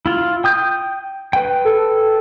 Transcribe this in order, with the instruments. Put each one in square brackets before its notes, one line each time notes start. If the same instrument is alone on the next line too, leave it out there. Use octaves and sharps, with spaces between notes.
[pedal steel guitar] E4 F4
G5 D#6 G6
B4 G5
[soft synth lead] A4